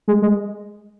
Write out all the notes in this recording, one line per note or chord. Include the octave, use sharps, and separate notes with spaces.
G#3
G#3